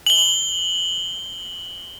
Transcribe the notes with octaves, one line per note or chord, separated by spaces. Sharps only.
F#7 G7